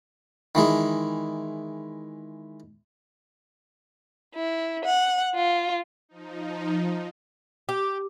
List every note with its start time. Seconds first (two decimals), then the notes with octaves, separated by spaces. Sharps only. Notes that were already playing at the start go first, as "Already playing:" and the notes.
0.55 D#3 E3 G#3
4.35 E4
4.85 F#5
5.35 F4
6.09 F3 D#4
7.69 G4